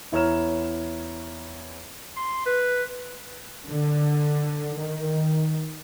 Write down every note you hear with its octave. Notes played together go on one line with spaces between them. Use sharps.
E2 E4 C#5 A#5 F6 E7
C6
B4
D3
D#3